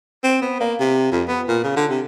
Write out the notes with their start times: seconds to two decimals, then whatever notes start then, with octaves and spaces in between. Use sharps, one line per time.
0.24 C4
0.42 B3
0.60 A#3
0.80 C3
1.12 F2
1.28 B3
1.48 A#2
1.64 C#3
1.76 D3
1.90 C3